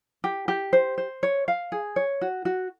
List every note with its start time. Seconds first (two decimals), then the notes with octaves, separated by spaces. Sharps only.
0.24 G4
0.48 G4
0.73 C5
0.98 C5
1.23 C#5
1.48 F5
1.72 G#4
1.96 C#5
2.21 F#4
2.45 F#4